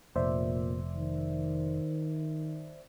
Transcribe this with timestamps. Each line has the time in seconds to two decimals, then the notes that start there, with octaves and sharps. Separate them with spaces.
0.16 F1 A#2 C5 D5 E5
0.96 D#3